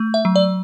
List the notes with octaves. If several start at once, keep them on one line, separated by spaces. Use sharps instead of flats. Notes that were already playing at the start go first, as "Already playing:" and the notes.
Already playing: A3
E5
F#3
D5